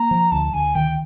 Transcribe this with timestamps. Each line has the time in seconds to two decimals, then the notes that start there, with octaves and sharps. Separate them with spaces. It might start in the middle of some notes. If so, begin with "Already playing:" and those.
Already playing: A#3 A#5
0.11 F3
0.31 D2 A5
0.54 D2 G#5
0.75 D#3 G5